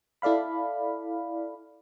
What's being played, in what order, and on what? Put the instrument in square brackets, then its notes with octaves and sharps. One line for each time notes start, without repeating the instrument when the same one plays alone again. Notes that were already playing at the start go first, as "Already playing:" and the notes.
[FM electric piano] E4 A4 D5 F5 B5